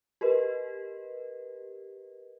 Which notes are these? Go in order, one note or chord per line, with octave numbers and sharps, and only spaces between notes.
G4 A#4 B4 D#5